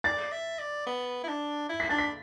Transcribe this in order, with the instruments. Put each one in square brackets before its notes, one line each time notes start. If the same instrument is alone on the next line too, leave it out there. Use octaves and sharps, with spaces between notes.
[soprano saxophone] D5 [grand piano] A6
[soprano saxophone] E5
D5
B3
E4
D4
E4
[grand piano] B6
[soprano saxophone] D4 [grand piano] A6
[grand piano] B6